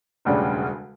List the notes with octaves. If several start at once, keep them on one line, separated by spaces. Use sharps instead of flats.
E1 D2 C#3 G3 D4